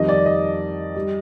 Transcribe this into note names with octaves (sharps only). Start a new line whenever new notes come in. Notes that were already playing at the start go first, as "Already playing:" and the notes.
Already playing: F2 D#3 G3 D#5
D5
D#5
G3